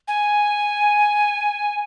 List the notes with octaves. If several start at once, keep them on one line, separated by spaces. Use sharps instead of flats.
G#5